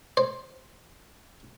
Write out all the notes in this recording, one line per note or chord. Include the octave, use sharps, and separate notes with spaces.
C5